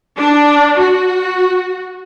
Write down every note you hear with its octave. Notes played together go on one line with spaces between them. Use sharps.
D4
F#4